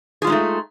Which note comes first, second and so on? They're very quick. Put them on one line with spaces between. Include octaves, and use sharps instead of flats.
G#4 F4 G#3 D#4 A3